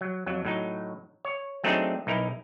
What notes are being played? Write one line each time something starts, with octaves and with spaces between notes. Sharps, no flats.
F#3
F2 F#3
A2 F#3 D#4
C#5
F#3 A3 C4 D4 D#4 G#4
B1 D#4 E4 A#4